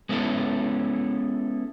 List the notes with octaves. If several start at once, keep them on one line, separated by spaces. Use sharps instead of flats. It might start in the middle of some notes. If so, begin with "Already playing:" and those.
G#3 B3 C#4 E4 A4